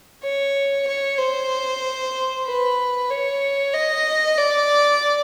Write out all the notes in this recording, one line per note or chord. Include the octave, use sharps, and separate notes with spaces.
C#5
C#5
C5
B4
C#5
D#5
D5